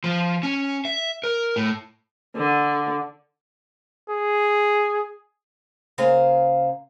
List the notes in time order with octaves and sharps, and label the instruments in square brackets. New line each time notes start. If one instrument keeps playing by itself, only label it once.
[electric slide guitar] F3
C#4
E5
A#4
A2
[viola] D3
[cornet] G#4
[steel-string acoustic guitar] C#3 A#3 C5 F5 G#5